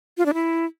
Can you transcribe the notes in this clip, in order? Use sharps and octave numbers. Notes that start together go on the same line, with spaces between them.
F4
D4
E4